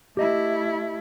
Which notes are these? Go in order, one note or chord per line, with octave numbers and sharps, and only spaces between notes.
A3 E4 G4 D#5 E5